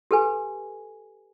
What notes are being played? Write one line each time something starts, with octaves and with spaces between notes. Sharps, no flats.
G4 A4 B4 G#5